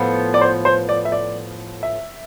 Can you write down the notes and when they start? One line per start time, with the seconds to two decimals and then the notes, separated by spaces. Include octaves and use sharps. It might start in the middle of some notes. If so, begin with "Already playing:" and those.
Already playing: A2 F3 B3
0.34 D5
0.41 C5
0.65 C5
0.89 D5
1.05 E5
1.12 D5
1.83 E5